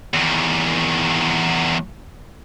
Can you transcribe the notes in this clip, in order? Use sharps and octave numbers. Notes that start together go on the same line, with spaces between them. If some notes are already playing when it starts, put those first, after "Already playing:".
E2 D#3